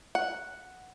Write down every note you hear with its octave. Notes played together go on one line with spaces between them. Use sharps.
F#5